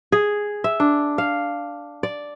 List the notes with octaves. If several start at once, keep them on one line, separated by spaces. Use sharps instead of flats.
G#4
E5
D4
F5
D5